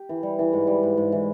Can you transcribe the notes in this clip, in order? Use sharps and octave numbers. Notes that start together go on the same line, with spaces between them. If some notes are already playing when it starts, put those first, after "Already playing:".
Already playing: G4
E3
G3
E3
G#2
G3
G#2
G#2
E3